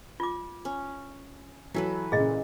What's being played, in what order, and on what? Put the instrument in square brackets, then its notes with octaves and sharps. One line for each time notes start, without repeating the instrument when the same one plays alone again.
[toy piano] F4 D6
[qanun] C#4
[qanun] E3 A4 B4 [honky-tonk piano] F#3
[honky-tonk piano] A#2 C#3 [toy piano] G#4 D#5